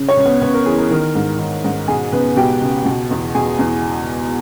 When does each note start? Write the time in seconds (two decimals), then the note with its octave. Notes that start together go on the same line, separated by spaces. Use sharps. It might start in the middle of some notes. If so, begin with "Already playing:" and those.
Already playing: C#3
0.09 C#4 C#5
0.17 C#2
0.25 B3 B4
0.41 C#2 B3 B4
0.54 A#4
0.66 E3 G#4
0.78 A#4
0.90 D#3 A#4
1.15 G#2
1.39 D#3
1.64 G#2
1.88 B2 G#4 G#5
2.12 C#2 B3 B4
2.36 B2 G4 G5
2.62 C#2
2.85 B2
3.11 E2
3.34 B2 G#4 G#5
3.59 E2